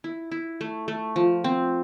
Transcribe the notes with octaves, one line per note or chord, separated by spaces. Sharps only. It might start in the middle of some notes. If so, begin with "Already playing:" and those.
E4
E4
A3
A3
F3
C4